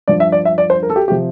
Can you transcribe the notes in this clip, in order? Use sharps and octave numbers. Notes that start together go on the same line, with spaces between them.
G2 F3 D5
E5
D5
E5
D5
C5
A#4
A4
G4
C3 F3 G4